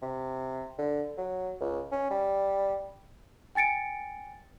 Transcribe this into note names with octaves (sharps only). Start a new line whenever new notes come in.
C3
D3
F#3
C#2
C#4
G3
G5 G#5 A6 C#7 D7